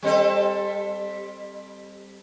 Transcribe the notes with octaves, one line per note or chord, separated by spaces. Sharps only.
G3 C4 A4